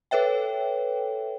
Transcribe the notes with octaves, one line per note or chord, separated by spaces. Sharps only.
A4 B4 C#5 E5 G5